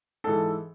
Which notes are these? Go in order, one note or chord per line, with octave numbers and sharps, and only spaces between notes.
G#2 E3 A4